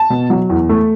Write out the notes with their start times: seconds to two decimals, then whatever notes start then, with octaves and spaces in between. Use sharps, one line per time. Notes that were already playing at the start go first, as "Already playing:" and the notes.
Already playing: A5
0.10 B2
0.30 F#3
0.50 E2
0.69 A3